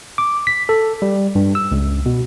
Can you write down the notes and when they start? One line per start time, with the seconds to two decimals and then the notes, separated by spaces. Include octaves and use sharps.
0.18 D6
0.47 B6
0.69 A4
1.02 G3
1.35 G2
1.55 E6
1.72 C#2
2.06 B2